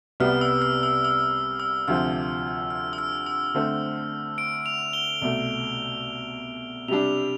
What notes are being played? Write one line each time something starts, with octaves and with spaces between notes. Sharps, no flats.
C2 C3 G3 B3 F6
E6
F6
E6
E6
E6
D2 C3 F3 F6
F6
E6
F6
E6
D3 A3 C4
D7
F7
G7
C2 B2 A3
C3 G3 D4 F7